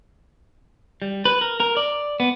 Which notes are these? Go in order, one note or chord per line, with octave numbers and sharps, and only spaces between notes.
G3
B4
A#4
A#4
D5
B3